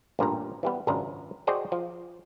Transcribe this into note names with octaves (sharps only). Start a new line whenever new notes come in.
A1 G2 A#2 A#5
E3 G3 B3
G#1 C#2 F#2 D4 A#5
F#4 G#4 C5 D5 D#5 G5
F3